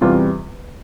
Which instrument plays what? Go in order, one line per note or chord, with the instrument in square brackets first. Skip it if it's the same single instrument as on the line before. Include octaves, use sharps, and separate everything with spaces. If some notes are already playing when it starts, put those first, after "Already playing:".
[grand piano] E2 C3 G3 F4